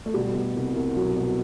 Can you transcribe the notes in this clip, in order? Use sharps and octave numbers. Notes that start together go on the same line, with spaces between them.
A3
B2 G3
B2
C2
C2
B2 F#3
B2